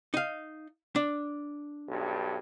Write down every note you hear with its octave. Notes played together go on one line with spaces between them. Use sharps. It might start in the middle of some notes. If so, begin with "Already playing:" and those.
D#4 F5
D4
B1 G2